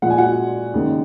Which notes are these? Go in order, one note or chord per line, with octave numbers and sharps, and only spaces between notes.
A#2 F3 G#3 F#5
G#5
F#4 F#5
D#2 C#3 G#3